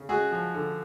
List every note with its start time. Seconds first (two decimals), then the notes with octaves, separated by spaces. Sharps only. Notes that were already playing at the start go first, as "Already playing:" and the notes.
Already playing: C#3
0.09 G#3 F#4 G#4
0.31 F3
0.54 D3